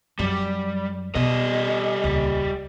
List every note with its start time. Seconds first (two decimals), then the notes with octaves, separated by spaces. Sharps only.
0.19 F#2 F#3 G3
1.15 B2 G3 D#5
2.04 D#1 C#2